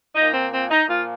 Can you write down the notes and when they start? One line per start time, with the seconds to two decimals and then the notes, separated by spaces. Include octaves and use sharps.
0.16 A#2 F3 A#3 D#4
0.34 C4
0.52 C4
0.71 D#4
0.88 A#2 F3 A#3 F4